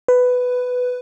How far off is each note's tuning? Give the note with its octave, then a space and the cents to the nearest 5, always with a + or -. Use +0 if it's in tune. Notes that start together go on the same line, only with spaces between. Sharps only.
B4 +10